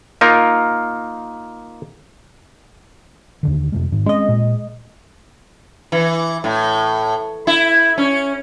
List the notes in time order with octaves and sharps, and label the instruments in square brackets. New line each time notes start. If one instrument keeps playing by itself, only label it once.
[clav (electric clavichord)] A#3 D#4 F4 A#4
[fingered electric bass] D#2 D3 D#3
F2 C3 G#3
G#2 D#3
[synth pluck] G#3 D#5 [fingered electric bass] C4 C#4
[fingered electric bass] A#2
[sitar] E3
A2
E4
C#4